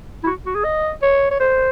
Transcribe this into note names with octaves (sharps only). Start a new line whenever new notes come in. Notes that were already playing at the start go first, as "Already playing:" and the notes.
E4
F#4
F#4
G#4
D#5
C#5
C#5
C5